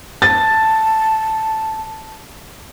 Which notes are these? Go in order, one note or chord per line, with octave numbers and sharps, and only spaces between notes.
A5 A6